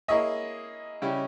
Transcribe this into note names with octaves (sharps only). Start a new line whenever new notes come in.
A#3 E4 G#4 C#5 D#5 E5
C#3 G3 C#4 E4 G4